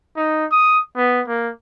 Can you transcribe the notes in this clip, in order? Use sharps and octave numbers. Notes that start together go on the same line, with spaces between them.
D#4
D#6
B3
A#3